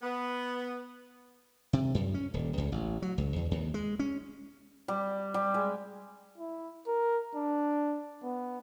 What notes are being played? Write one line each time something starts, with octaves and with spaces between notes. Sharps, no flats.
B3
C3
F#2
C#4
D#1
C#2
A1
F#3
C#2
E2
D#2
G#3
C#4
G3
G3
G#3
E4
A#4
D4
B3